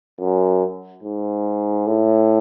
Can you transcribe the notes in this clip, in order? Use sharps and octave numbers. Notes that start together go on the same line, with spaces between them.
F#2
G#2
A2